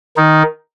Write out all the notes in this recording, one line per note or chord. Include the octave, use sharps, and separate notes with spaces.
D#3 D#4